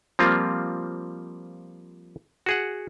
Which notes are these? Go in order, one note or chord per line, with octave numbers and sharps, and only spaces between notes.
F3 G3 A#3 C4 F4
F#4 G#4 F#5